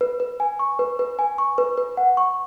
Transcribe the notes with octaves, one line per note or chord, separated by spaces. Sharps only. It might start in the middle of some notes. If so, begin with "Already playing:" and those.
B4
B4
G#5
C#6
B4
B4
G#5
C#6
B4
B4
F#5
C#6